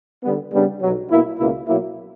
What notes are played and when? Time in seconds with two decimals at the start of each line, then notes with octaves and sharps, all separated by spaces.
0.24 D3 G3 B3
0.53 C#3 G3 B3 D4
0.82 B1 B2 F#3
1.10 B2 A#3 E4
1.39 C#2 B2 A#3 E4
1.67 B2 F#3 A#3 E4